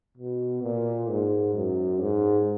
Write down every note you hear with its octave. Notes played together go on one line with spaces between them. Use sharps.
B2
A#2
G#2
F#2
G#2